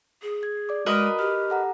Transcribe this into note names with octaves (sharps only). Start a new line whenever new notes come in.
G#4
G#6
D5 D6
G#3 F#4 A#4 B4 D#5 D#6
G4 F6
A4 F#5 A#5